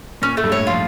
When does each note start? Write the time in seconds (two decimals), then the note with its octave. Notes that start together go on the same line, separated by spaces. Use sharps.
0.22 A#2 C#4
0.37 A3
0.44 G2
0.52 A2 C#5
0.67 F3 F4